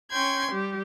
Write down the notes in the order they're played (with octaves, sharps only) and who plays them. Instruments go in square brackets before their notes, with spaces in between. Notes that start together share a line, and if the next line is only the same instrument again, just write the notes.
[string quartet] C#4 G5 C6 G#6
G3 G4